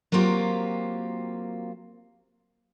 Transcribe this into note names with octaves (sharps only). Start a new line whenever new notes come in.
F#3 A#3 C4 F4 G4